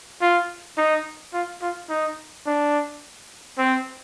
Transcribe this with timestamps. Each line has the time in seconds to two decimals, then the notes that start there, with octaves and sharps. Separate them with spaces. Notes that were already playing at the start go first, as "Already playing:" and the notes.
0.21 F4
0.78 D#4
1.33 F4
1.62 F4
1.89 D#4
2.46 D4
3.58 C4